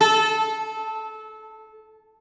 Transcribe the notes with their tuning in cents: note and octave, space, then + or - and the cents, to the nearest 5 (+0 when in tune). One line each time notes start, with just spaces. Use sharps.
A4 -20